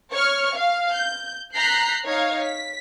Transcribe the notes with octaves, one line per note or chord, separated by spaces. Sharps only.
C#5 C#6 F6
F5
G6
A#5 F#6 G6 B6 C7
D#4 C#5 F5 G#6
B6